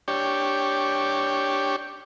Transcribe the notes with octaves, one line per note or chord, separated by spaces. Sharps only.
D4 G4 C#5